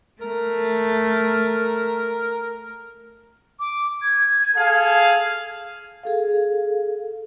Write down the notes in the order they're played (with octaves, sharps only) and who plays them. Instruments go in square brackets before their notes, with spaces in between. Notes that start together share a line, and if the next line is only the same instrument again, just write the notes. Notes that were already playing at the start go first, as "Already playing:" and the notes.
[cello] A3 [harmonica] A#4
[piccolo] D6
G#6
[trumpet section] G#4 A4 F5
[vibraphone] G#4 A4 F5